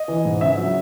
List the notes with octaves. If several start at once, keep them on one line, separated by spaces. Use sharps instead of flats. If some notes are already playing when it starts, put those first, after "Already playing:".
Already playing: D#5
E3
G#2
C#3 E5
F#3